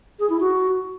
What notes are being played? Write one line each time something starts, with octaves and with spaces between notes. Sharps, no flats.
G#4
E4
F#4